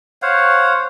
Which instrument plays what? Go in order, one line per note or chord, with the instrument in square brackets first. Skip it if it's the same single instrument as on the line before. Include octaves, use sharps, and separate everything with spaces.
[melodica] C5 C#5 F5 F#5